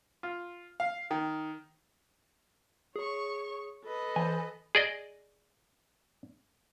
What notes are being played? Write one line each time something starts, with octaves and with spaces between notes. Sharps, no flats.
F4
F5
D#3
G#4 C#5 C#6
A4 B4 D#5
E3 C5 G#5
G#4 D5 D#5